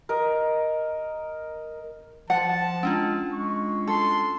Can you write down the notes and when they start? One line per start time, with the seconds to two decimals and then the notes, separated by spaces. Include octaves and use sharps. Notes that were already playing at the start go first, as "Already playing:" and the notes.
0.09 A#4 D#5
2.30 F3 F#5 A5
2.83 G#3 C#4 D4 F4
3.33 G#3 C#6
3.87 A4 C6